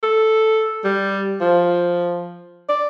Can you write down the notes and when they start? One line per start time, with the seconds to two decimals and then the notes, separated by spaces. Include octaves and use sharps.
0.03 A4
0.84 G3
1.41 F3
2.69 D5